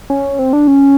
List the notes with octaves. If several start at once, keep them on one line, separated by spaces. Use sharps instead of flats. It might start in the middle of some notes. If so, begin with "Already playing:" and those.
C#4
C4
D4
C#4